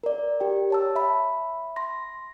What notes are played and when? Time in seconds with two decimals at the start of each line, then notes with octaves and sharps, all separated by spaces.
0.03 A#4 D5
0.40 G4 G5
0.70 C#5 A5 E6
0.95 E5 B5
1.76 C6 A#6